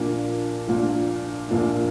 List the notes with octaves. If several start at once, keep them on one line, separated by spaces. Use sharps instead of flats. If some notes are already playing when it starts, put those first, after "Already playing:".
Already playing: A#1 A#2 A#3 D4
A#1 A#2 A#3 D4
A#1 A#2 A#3 D4